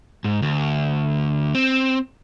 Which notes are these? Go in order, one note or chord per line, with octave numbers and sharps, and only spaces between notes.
G#2
D2
C4